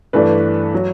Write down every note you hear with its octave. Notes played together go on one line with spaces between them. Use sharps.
G2 E3 A3 D4 B4
F#3